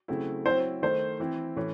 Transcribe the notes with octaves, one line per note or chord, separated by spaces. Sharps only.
C#3 F#3 A3 C4 E4
F#3 C4 E4 C5
D#3 A3 D#4 C5
E3 C4 E4
A2 E3 A3 C#4